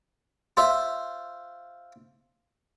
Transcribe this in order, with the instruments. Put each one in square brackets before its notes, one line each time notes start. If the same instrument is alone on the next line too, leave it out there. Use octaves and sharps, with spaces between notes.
[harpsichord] F4 C5 E5